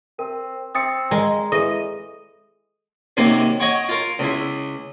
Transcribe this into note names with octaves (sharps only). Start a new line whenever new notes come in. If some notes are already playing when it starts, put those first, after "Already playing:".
C4 A#4
C4 D#6 A6 C#7
G#3 A#4 D#5
E3 G#4 A4 D#5 D#7
F#2 C3 D#3 A#3
C#5 D#5 F#5 G5 C#6
F4 A#4
C#2 E4